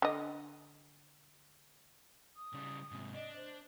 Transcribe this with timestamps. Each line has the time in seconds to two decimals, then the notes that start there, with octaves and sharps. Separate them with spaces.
0.02 D3 D#5
2.37 D#6
2.54 C#3 G3
2.91 G#2 C3
3.14 D4 D#5
3.36 C5